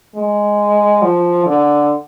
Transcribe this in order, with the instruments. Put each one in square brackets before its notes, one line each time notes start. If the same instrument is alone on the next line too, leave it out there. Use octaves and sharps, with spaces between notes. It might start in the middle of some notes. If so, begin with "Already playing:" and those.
[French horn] G#3
F3
D3